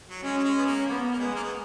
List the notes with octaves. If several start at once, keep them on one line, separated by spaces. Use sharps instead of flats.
F#3
G#3 C#4
F#3
G#3
B3
A#3
A#3 B3
A#3
G#3 B3
A#3
B3